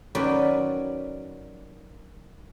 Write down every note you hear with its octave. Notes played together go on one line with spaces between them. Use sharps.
D#3 F#3 C#4 B4 D5